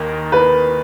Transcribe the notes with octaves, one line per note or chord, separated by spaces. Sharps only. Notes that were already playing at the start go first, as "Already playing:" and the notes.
Already playing: D#2 D#3 A#3 A#4
B4